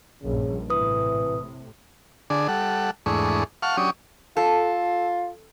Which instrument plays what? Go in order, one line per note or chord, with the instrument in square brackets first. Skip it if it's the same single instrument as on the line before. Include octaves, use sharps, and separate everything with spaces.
[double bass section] A#1 G2 [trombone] C#3
[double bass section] A2 C3 [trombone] E3 [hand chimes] B4 D#6
[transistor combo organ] D3 D4 G#4
G3 A4 F#5
E2 G#2 A3 D4 G#4 C#6
F5 F#5 A5 C#6 F6
F#3 C#4 D4 G4 C#6 D#6
[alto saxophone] F4 [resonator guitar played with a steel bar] A4